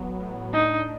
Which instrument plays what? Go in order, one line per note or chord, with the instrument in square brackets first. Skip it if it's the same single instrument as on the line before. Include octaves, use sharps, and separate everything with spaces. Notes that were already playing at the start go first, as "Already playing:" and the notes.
Already playing: [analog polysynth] A1 F#3 B3
A2
[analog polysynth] D4 [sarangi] D#4